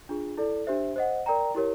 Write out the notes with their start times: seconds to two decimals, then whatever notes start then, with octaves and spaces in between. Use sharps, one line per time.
0.09 D4 F4 G#4
0.37 E4 A4 D5
0.67 D4 G4 C5 E5
0.96 C5 D#5 F#5
1.26 A#4 D5 G5 A#5
1.55 E4 G4 A#4 C#5